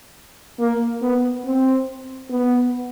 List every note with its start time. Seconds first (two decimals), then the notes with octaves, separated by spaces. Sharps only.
0.60 A#3
1.02 B3
1.45 C4
2.30 B3